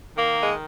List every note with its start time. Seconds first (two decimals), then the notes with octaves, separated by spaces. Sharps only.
0.16 D#3 A#3
0.43 G#3